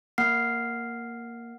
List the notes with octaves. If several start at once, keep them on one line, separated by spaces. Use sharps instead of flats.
A#3 F#5 F6 C7